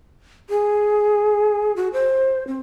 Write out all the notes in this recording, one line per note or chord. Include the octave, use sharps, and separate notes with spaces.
G#4
F#4
C5
C4